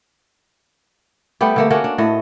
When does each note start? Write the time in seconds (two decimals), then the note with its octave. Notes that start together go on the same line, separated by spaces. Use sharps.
1.41 G3 A3 B3 G4
1.56 D3 A3 A#3
1.70 A#3 C#4 D4 F#4
1.84 D4
1.98 A2 A3 D#5